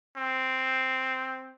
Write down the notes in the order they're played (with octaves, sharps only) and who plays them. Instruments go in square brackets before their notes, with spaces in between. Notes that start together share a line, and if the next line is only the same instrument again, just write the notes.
[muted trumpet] C4